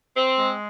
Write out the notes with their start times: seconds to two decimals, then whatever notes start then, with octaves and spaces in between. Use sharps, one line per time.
0.17 C4
0.39 G#3